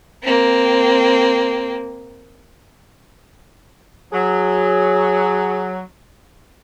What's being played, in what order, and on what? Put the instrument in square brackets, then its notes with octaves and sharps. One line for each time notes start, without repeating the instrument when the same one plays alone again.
[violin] A#3 C4
[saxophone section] F#3 [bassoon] G#4